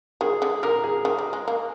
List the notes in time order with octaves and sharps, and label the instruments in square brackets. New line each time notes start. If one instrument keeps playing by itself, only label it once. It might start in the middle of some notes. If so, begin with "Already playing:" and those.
[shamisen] D#3 [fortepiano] G#4
[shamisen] D3
[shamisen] D3 [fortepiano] A#4
[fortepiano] G#4
[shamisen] D#3
G3
G#3
A#3